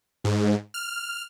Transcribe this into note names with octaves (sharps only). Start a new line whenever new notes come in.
G#2
F6